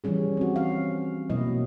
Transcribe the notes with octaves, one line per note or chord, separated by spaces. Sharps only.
E3 F3 G3 C#4 G#4
C4 F#4
F5
B2 F#3 A#3 E4 D#5